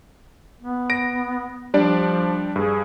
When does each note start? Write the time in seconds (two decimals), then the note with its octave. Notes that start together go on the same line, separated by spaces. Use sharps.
0.61 B3
0.90 A#6 D7
1.74 F3 G3 D4 D5
2.56 G2 G#4